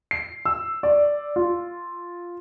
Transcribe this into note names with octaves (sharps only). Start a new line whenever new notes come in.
C7
E6
D5
F4